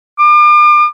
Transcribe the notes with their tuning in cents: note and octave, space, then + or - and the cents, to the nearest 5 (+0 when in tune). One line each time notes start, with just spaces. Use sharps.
D6 +40